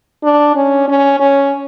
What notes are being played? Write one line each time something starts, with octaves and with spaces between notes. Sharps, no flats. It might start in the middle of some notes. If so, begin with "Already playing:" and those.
D4
C#4
C#4
C#4